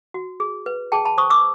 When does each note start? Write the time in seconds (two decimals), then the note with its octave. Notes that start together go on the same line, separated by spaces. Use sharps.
0.14 F#4
0.40 G#4
0.66 B4
0.92 G#4 G5 A5
1.05 A5 B5
1.18 C5 C#6 D#6
1.30 D6 E6